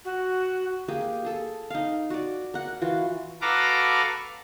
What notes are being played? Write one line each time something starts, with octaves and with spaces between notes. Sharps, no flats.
F#4
A#3 G4 G#4
G#4 A4
D#4 F5
F#4 D5
A#4 F#5
E3 F4 F#4
F#4 A4 B4 F5 A#5 D6